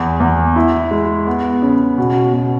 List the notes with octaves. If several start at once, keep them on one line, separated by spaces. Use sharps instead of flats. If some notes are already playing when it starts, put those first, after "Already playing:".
Already playing: E2
E2
E4
G#3
B3
C#3
B2
B2